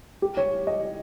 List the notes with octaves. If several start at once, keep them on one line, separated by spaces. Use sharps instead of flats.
G4
C#5
D#5